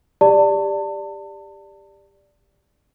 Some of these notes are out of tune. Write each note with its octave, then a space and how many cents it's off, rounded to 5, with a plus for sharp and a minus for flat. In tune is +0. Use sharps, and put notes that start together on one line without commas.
G4 +20 D5 +0 A5 +35